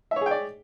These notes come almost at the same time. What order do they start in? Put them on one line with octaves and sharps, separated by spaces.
E5 C#5 G#4 G5 D5